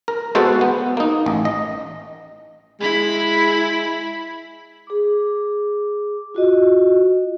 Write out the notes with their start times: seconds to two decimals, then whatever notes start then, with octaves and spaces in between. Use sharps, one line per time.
0.08 A#4
0.35 G#3 B3 F#4 A4 C5 F#5
0.61 B3
0.97 A#3 D#4
1.26 A1
1.45 D#5
2.80 G#3 E4 B5
4.87 G#4 D6
6.35 F4 F#4 D#5